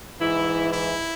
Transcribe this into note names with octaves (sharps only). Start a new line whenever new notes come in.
G#2 E3 E4
E4